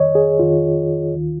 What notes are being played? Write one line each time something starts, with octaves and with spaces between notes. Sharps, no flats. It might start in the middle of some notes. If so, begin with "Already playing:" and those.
Already playing: F2 D#3 C#5 D#5
G#4
F2 D#3 F4
D#2 D#3